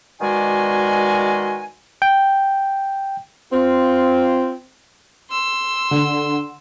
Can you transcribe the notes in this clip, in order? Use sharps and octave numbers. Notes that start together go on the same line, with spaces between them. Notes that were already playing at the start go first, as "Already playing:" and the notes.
B2 D#3 G#3 F#4 D5 G#5
G5
C4 F4
C6 E6
D3